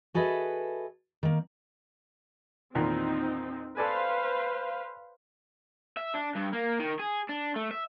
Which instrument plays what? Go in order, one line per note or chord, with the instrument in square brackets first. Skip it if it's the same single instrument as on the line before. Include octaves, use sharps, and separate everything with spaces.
[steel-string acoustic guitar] F#4 G#4 A4 B4 D#5 E5
D#3 A#3
[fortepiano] E2 A#2 D#3 [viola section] C4 D#4
[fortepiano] A4 D5 G#5 [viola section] B4 C5 F5
[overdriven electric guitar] E5
D4
G2
A#3
D#3
G#4
D4
A3
E5